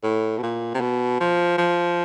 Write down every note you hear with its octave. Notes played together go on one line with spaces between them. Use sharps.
A2
B2
A#2
C3
B2
F3
F3